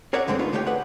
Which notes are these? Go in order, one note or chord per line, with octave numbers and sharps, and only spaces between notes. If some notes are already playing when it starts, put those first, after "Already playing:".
G#4 A#4 C#5 D5 E5 F#5
G2 D3 E3 G#3 A3 C4
A3 B3 D#4 F4
D3 A3 G4 C#5 D5 G5
G#4 B4 D5 F#5